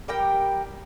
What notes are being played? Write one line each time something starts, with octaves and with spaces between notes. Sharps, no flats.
G3 G4 A#4 G5